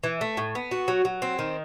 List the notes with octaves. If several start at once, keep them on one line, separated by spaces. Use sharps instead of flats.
E3
A3
A2
B3
F#4
F#3
F#3
C4
D#3